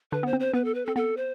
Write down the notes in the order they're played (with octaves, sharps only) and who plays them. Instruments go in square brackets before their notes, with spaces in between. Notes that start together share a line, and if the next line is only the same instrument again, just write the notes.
[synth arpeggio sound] D3 D4 [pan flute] B4
[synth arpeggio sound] B3 [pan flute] C5
[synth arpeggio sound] C4
[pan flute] C5
[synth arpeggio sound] B3 [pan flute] B4
[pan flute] A4
B4
[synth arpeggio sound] C4 [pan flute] A4
[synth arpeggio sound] B3 [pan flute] A4
[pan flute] C5